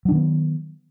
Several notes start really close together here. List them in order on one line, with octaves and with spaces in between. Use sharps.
F#3 D4 D#3 B3